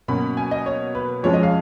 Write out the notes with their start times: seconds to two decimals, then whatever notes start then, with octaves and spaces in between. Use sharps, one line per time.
0.08 B2 F#3 A#3 C#4 B5
0.37 G#5
0.51 D#5
0.66 C#5
0.95 B4
1.23 F2 F3 G#3 C#4 C#5
1.34 D#5
1.43 F5